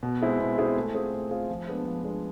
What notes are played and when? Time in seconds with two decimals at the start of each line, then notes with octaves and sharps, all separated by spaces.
0.03 B2
0.21 G#3 C4 E4 G#4
0.40 B2
0.58 G#3 C4 E4 G#4
0.76 A3
0.94 C4 F4 G#4
1.13 A3
1.31 C4 F4 G#4
1.49 F3
1.67 G#3 B3 D4
1.85 F3
2.04 G#3 B3 D4